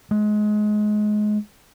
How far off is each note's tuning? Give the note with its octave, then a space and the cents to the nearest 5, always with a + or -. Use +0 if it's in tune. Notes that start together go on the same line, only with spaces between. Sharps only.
G#3 +25